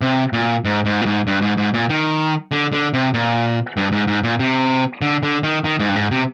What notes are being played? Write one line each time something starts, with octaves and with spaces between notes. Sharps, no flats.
C3
A#2
G#2
G#2
A#2
G#2
G2
G#2
G#2
A#2
D#3
D3
D3
C3
A#2
G2
G#2
G#2
A#2
C3
D3
D3
D#3
D#3
G#2
G2
G#2
C3